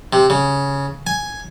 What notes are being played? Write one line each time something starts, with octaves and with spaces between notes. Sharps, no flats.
C3
C#3
G#5